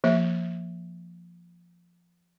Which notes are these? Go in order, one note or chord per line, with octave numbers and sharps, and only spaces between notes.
F3 A#3 E5